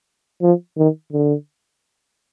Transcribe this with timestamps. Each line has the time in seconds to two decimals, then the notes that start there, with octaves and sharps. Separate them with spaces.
0.42 F3
0.78 D#3
1.13 D3